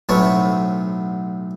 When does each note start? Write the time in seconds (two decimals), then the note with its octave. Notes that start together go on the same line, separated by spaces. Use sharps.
0.09 B1 A2 B3 C4 C#5 F#5